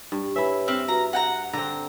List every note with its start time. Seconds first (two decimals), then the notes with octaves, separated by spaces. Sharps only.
0.12 G2
0.36 E4 B4 C#5 E5 G#5
0.68 C4 E5 F6 F#7 G7
0.88 F#4 B4 A#5
1.13 F#5 G5 A#5 F#6
1.53 D3 C4 A#5